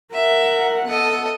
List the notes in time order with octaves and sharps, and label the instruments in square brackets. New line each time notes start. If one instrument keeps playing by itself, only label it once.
[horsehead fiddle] A#4 F#5 [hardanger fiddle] E5
[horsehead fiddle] B3 A4 [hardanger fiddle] D#5 F#5